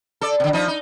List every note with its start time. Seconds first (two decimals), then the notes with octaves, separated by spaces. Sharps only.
0.21 A4 D5
0.40 B2 D3
0.53 F3 D#4
0.68 D#4